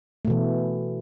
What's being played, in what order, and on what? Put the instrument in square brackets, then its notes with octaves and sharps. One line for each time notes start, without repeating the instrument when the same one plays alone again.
[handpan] A3
B2
E3